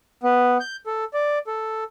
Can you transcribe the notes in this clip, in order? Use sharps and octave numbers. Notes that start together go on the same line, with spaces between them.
B3
G6
A4
D5
A4